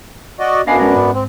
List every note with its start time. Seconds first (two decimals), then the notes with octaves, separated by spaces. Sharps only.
0.39 F#4 D5 D#5
0.67 F#2 B3 D4 D#5 F5 G#5
0.79 G#3 C#4 A#4
0.95 G#2
1.14 C4